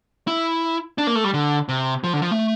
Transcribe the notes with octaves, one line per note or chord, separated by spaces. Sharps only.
E4
D4
A#3
A3
G3
D3
C3
F3
D3
F3
A3